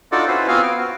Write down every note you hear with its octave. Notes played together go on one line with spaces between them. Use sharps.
D4 D#4 F4 F#4 A4 D5
C#4 E4 F#4 B4 C5
B3 C4 F4 F#4 F5 G#5
G5
F#4